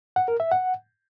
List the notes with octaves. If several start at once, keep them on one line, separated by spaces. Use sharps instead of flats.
F#5
A#4
E5
F#5